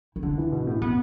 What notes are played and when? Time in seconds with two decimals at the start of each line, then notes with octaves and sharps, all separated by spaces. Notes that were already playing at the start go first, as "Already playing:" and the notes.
0.16 E4
0.23 D3 D4
0.38 E3
0.52 B2
0.67 A2
0.82 B3